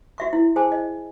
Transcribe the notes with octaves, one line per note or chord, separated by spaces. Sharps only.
F#4 E5 C#6
E4
G#4 C5 G#5 A5
D#5